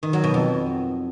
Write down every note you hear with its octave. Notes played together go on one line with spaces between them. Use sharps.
D#3
F#3
B2
F2